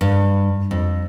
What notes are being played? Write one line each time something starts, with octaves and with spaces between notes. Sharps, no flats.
G2
F2